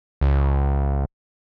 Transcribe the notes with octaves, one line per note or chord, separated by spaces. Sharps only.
C#2